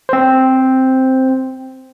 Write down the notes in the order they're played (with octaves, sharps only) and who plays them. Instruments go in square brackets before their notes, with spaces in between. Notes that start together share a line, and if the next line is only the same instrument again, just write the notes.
[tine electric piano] C4 C5